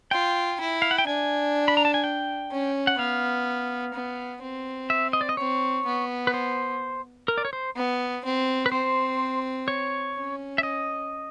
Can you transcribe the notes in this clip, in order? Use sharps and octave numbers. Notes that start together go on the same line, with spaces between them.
F4 G5
E4
F5
F#5
G5
D4 G#5
B5
A#5
A5
G#5
G5
C#4
F#5
B3 F5
B3
C4
E5
D#5
D5
D#5
C4 C#5
B3
B4
C5
A#4
D5
C#5
C5
B3
C4
B4
C4 C5
C#5
C#4
E5
D#5